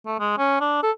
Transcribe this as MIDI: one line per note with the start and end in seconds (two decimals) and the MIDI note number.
0.06 0.16 57
0.20 0.36 56
0.38 0.59 61
0.61 0.79 62
0.83 0.91 69